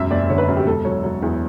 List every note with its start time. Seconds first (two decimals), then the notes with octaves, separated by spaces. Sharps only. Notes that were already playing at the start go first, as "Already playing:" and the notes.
Already playing: E1 F#2 E5
0.11 F#1 D5
0.29 D3 C#5
0.38 B4
0.48 F#2
0.57 G4
0.66 E1 A4
0.85 F#3 C#5
1.04 F#3
1.22 E2